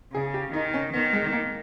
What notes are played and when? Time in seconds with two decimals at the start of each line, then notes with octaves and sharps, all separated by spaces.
0.14 C#3 G#4
0.34 G4
0.53 D#3 D#4
0.74 C#4
0.93 D#3 B3
1.13 G#3
1.33 A#3